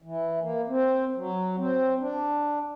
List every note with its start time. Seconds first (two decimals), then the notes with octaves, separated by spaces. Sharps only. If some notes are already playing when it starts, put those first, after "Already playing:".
0.02 E3
0.40 A#3
0.68 C4
1.16 F#3
1.57 C4
2.00 D4